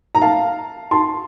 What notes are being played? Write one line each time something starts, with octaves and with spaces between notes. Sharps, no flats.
A#5
F5 A5
A5 C6